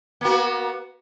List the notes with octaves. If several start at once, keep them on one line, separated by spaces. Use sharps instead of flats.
A#3 B3 F#4